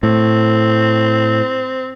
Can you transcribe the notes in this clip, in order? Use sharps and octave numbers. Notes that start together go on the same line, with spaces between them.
A2 C4